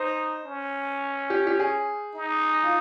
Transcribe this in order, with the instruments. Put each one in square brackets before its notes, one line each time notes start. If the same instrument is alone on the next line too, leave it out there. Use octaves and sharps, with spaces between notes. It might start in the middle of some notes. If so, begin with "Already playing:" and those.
Already playing: [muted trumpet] D#4 [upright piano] C5
[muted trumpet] C#4
[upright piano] G4
G4
G#4
[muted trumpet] D#4
[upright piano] F4